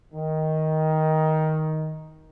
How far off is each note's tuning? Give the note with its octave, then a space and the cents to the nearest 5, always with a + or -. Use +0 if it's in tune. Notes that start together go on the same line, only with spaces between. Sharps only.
D#3 +10